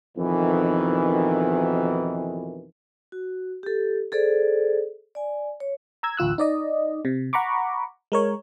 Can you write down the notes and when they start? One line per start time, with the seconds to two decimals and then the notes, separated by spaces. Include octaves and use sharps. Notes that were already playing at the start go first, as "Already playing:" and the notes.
0.17 F2 B2 D#3 E3
3.12 F#4
3.63 G4 A4
4.12 G#4 A4 C5 D5
5.15 D5 G#5
5.60 C#5
6.03 A#5 E6 G#6
6.17 A1 D2 F4 E6 F#6
6.38 D#4 D5 D#5
7.05 C3
7.33 F#5 A#5 B5 C#6 D6
8.12 G#3 A#4 C#5